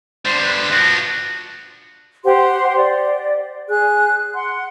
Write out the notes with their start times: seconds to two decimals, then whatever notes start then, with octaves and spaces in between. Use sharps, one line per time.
0.26 D3 G3 C5
0.43 B4
0.72 F3 D4 F#4
2.24 G4 C5 F#5 C6
2.75 D5
3.68 G#4 F#6
4.34 F#5 C6